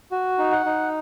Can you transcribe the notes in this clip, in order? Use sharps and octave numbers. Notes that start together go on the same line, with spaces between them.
F#4
D#4
F#5
D#4